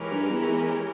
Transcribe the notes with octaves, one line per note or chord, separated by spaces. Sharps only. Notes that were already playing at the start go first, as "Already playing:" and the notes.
Already playing: E3 G#3 C#4 G4 A#4
G2
E2
E2